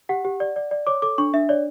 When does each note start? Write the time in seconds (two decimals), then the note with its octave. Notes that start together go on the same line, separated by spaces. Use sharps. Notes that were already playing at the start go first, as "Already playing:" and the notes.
0.09 G4 F#5
0.25 G4
0.40 D5
0.56 D5
0.71 D5
0.87 C#5 D6
1.02 A4 D6
1.18 D4 C#6
1.33 D4 E5
1.49 C#5 D5